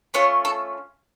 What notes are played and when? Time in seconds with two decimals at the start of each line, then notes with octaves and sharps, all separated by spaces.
0.14 A3 C#4 F4 C#5
0.45 A4